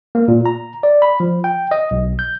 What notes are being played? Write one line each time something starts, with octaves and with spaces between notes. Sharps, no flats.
A#3
A#2
A#5
D5
B5
F3
G5
D#5
B1
G6